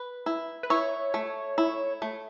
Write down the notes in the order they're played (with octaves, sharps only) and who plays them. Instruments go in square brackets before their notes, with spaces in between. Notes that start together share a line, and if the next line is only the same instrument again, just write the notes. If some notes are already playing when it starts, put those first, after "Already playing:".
Already playing: [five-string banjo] B4
E4
[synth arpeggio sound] B4
[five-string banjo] E4 [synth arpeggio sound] C#5
[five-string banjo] A3
E4
A3